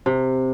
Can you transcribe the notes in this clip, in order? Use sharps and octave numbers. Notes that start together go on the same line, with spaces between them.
C3